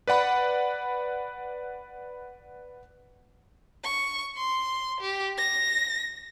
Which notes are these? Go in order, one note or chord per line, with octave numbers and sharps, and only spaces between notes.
B4 D5 F#5 B5
C#6
C6
G4
A#6